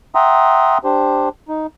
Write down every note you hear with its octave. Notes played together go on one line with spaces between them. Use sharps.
E5 F#5 G5 A#5 C6 D#6
D4 G4 C5
D#4